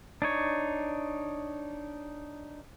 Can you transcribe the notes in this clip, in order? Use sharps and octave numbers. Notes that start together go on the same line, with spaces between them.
D4 D#4 C#5